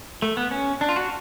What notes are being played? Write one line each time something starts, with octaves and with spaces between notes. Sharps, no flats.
A3
B3
C#4
D4
F4
F#4